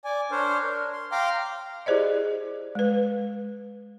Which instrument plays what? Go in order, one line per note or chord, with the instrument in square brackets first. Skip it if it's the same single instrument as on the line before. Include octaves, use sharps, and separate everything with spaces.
[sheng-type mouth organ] D5 G#5
D4 A#4 C5 C#5
A#4
C6
F5 G5 A#5 C6 D6 F6
[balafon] E4 G4 G#4 C5 D5 D#5
G#3 B4